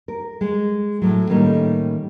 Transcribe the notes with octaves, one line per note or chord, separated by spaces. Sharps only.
A#4
G#3
A2 F#3
A2 D#3 G3 A#3 C#4